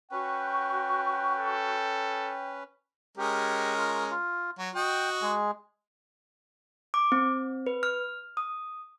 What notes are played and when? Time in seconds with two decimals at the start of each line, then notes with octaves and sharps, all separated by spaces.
0.11 C#4 F#4 B4 G5 C#6 F#6
1.37 A4
3.18 G#3 C#4 G4 A#4
3.77 F4
4.11 F4
4.59 F#3
4.75 F#4 D#5 G5
5.22 G#3 G#4
6.94 D6
7.12 C4
7.66 B4
7.83 F6
8.37 D#6